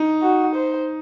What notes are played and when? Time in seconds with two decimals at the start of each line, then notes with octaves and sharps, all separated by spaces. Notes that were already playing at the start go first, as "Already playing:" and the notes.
Already playing: D#4
0.22 F#4
0.55 C5